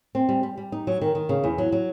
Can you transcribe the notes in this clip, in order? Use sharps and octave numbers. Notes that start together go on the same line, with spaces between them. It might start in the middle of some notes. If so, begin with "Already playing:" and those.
C4
G3
G3
G3
D#4
F#3
D#3
D#3
C#3
E2
F#3
F#3